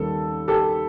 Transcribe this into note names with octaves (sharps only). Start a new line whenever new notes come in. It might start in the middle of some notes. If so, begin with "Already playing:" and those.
Already playing: D#2 D#3 G3 A4
G4 A4